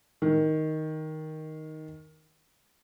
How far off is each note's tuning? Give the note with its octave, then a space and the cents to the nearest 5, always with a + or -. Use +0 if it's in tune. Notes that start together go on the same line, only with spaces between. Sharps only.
D#3 +5